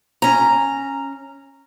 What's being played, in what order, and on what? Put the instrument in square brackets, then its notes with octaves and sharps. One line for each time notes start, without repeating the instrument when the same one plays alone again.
[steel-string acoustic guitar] C#4 A#5